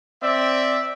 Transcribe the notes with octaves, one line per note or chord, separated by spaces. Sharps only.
C4 D5 E5